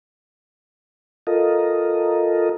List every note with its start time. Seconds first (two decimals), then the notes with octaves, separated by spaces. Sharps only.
1.27 F4 A4 A#4 D#5